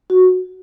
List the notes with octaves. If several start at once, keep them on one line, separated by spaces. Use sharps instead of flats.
F#4